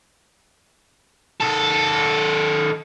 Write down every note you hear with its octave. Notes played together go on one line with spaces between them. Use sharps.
D#3 A4